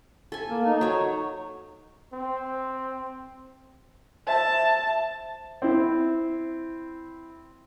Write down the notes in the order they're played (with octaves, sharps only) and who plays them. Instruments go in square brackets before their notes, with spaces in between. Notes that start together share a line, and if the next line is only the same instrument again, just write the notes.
[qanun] A4 G#5
[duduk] A#3
D#4
[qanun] F#3 C#5
[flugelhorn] C4
[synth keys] C5 E5 [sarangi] A5
[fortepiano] C4 E4